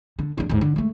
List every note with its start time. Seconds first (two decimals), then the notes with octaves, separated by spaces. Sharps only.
0.19 D3
0.38 E2 D4
0.49 D#2 G#2
0.61 D3
0.76 G#3 A3